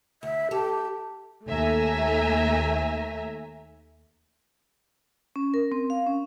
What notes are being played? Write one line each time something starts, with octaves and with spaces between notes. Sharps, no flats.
D2 E5
G4 A4
D#2 A3 E5 G#5 A#5
C#4
A#4
C4
F5
C#4